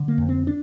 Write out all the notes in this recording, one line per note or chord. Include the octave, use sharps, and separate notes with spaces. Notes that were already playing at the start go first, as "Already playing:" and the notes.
Already playing: D3
A#3
F2
C4
D4